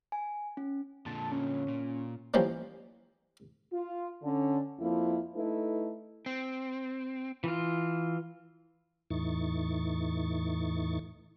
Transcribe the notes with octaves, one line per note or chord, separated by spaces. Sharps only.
G#5
C#4
A#2 D3 A5
C#4
A#2
E3 F3 G3 A#3 C#4
F4
D3 C#4
F2 F3 A#3 E4
A3 D#4 E4 A4 B4
C4
E3 F4
E2 A2 E3 D#4 C#6 A6